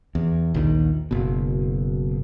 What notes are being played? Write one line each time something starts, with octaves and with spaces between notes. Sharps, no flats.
E2
A#1 D#2 D#3
F#1 B2